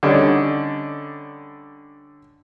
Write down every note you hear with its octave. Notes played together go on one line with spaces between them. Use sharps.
D3 G3 C#4 D#4